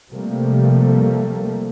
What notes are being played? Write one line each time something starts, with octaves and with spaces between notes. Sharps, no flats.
C3 F3 G3 A3 A#3